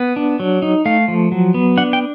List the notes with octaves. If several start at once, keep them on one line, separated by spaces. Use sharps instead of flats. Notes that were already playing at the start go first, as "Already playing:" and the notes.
Already playing: B3
D4
F#3
D#4
A3 F5
F3
F#3
B3
D4 F#5
G5